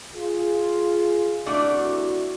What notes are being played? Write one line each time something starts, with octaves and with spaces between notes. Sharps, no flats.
F4 G#4
C2 A3 D4 E4 F#4 D5